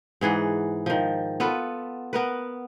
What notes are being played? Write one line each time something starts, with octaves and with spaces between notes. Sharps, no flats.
G#2 E3 G#4 F#5
D#3 F3
B3 F4 A4 B4
B3 A#4 B4